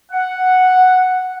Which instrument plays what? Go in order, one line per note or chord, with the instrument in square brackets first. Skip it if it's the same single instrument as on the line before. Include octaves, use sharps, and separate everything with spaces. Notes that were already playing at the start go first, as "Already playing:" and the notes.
[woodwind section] F#5